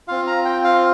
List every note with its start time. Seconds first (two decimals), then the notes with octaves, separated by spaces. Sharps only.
0.08 C4 F4 F5
0.27 A#5
0.45 G5
0.64 F5